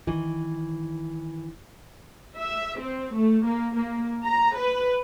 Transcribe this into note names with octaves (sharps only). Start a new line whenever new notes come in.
D#3 E3
E5
C4
A3
A#3
A#3
A#5
B4